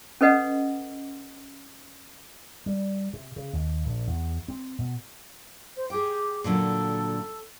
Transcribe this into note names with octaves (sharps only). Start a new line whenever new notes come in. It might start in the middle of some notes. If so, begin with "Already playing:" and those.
C#4 A4 B4 D#5 F#5
G3
C3
C#3
D#2
A#1
E2
C4
B2
C5
G4 G#4 G5
A#2 D3 F#3 A4